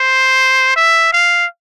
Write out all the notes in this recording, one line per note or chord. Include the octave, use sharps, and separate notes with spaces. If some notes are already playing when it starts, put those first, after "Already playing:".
Already playing: C5
E5
F5